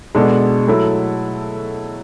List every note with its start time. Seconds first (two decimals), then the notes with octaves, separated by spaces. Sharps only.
0.15 B2 G#3 D4 A4
0.68 F#3 A3 E4 A4